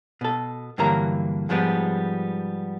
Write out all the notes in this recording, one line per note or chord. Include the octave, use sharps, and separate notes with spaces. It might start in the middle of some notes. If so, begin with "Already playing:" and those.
B2 A4
G2 D3 E3 F#3 A#3 A#5
G#2 F3 G3 G#3 B3